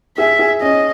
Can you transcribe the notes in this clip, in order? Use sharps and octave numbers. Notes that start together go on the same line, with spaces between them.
G#4 E5
G#4
C#4 D#5